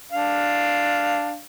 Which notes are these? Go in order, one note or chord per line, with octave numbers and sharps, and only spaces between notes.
D4 F5